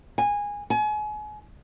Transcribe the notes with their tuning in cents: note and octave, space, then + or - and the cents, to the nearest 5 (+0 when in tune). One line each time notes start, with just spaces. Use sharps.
G#5 -15
G#5 +35